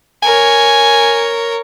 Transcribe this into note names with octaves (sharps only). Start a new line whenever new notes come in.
A#4 C#5 G#5